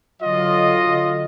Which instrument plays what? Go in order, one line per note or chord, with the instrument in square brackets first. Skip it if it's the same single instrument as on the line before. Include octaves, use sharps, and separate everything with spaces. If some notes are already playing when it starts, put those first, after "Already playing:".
[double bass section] D3 F#3 [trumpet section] F4 D#5